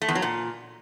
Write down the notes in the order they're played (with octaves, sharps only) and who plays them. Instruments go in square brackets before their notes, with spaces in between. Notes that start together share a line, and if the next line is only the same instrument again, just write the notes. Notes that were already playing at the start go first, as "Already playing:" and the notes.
[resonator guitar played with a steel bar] A3
E2
F#3
A#2